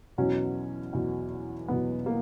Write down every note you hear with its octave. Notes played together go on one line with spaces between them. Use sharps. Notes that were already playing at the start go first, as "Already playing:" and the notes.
E2 B2 F#3 C#4
E2 B2 F#3
E2 B2 F#3 B3
A#3